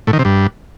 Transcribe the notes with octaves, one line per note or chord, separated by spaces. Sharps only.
A2
D#3
C3
G2